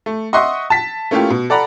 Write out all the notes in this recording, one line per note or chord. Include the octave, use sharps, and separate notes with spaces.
A3
D#5 E5 F#5 C6 C#6 D#6
A5 B6
A3 A#3 C#4 E4 F4 G4
B2
A4 D5 F#5 A#5 B5